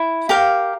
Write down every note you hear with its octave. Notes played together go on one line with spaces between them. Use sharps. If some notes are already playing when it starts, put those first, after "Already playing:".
Already playing: E4
G4 A#4 F5